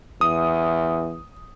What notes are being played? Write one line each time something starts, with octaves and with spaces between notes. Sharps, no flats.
E2 D#6